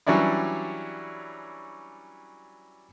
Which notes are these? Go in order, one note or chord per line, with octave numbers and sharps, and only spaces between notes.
E3 F#3 G3 C#4 D4 E4